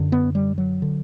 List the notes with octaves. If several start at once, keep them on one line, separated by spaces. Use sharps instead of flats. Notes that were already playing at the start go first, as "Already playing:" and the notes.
Already playing: F#2 D3
B3
G3
F#3
D3